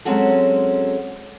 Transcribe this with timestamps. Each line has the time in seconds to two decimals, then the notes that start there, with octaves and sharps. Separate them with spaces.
0.05 F#3 G#3 C4 C#4 F#4 A4